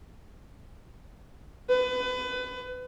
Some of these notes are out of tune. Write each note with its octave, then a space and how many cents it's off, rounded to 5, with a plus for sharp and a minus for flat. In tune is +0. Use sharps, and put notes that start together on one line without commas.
B4 +30